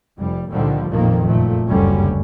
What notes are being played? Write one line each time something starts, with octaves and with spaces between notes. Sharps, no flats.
F1 G3
C#2 A#2 D3 D#3 F3 G3
A1 F2 A#2 D#3 F3 A#3
F#1 A#2 F3 A3
F#1 D2 G2 D3 G3 C#4